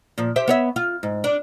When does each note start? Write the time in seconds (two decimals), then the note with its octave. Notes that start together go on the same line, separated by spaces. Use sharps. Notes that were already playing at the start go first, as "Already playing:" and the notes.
0.18 A#2 F3
0.36 G4 C5 E5
0.48 B3 C#5 E5
0.76 F4
1.03 G#2
1.24 D4